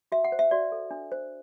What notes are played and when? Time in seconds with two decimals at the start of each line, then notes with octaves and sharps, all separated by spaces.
0.12 F#4 E5
0.24 F#5
0.32 C5
0.39 E5
0.51 F#4 D5
0.72 A4
0.91 D4
1.12 C5